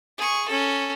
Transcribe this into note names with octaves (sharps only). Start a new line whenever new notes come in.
G#4 C#6
C#4 A4